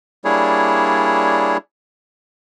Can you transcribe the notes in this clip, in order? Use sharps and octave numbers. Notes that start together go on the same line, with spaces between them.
G3 A#3 D4 E4 G#4 C#5